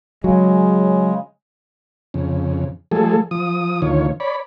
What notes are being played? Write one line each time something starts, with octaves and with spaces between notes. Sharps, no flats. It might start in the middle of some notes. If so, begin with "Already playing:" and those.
C#3 F#3 G#3
F2 C#3
F3 G3 A3 G#4 A4
F3 D#6
D2 D#3 F4 C#5
C#5 D5 B5